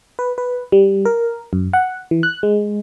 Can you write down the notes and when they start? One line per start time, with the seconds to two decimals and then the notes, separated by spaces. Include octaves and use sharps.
0.19 B4
0.38 B4
0.72 G3
1.05 A#4
1.53 F#2
1.73 F#5
2.11 E3
2.23 F#6
2.43 G#3